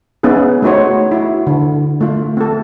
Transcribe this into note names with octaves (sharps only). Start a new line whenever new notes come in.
B3 C#4 D#4 G#4
A3 B3 D#4 F#4 C5 C#5
E4 F#4
D3
A3 F4
C4 A4